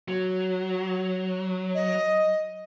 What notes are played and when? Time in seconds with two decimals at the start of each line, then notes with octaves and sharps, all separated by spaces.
0.08 F#3
1.75 D#5